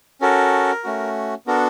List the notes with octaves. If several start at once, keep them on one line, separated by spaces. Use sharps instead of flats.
C#4 F#4 A4 A#4
A3 C#4 F#4
B3 D4 F#4 A4 A#4